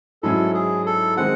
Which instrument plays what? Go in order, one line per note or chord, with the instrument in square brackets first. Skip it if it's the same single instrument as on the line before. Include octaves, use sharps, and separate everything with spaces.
[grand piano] G#2 F#3 C#4 E4 [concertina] A4
[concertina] G#4
A4
[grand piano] D#3 G#3 C4 [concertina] F#5